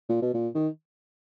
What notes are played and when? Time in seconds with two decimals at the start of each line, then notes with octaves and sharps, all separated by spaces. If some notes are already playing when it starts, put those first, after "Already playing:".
0.09 A#2
0.22 B2
0.34 A#2
0.54 D#3